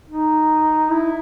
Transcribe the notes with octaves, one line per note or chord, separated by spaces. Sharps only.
D#4
E4